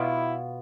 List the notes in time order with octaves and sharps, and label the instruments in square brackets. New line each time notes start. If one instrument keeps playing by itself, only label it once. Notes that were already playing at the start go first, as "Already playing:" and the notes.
Already playing: [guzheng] B2 B3 F4 [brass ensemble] E4